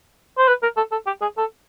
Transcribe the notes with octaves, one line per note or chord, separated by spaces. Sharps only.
C5
B4
A#4
A4
A4
G4
G#4
A4